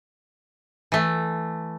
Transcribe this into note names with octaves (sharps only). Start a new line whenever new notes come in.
E3 A3